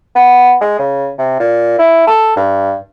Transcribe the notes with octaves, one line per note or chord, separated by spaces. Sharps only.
B3
G#3
C#3
C3
A#2
E4
A4
G2